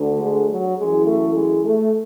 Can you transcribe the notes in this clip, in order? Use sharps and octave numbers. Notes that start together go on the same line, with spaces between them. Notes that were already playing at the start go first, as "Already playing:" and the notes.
Already playing: D2 D3
G#3
F#3
F#2 E3 G#3
A3
G#3
A3